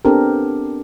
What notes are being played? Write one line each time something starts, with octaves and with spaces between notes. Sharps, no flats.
B3 C4 D4 G4 A4 A#4